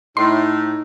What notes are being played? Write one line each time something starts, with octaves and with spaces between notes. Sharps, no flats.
A2 D#4 C6